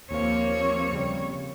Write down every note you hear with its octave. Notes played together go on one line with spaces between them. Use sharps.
D#2 F3 A#3 C4 C#5 F5
C#3 G3